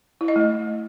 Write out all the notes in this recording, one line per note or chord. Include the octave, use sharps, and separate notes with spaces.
E4
D#5
A3